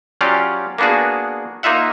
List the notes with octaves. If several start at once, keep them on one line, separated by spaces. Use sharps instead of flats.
F#3 C#4 F4 G4 D5 F5
A#3 B3 D4 F#4 G#4
A#3 D#4 F4 E5 F#5